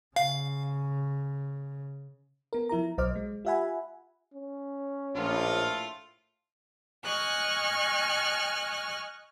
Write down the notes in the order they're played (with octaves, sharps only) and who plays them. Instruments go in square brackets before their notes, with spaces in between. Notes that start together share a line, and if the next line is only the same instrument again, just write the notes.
[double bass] C#3 [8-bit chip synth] F5
[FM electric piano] B3 A#4
F3 E4 A#4 A#5
B1 F#3 C5 D#5 D6 F6
G#3
F4 G4 E5 F#5 G#5 B5
[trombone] C#4
[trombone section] A#1 [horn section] A2 A3 F4
[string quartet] D#5 G#5 C#6 F6 F#6